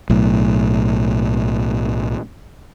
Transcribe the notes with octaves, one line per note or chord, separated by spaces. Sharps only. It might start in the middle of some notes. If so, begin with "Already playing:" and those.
B1 A2